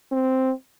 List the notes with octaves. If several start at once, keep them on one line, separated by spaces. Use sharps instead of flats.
C4